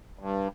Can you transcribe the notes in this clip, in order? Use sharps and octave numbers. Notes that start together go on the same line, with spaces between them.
G2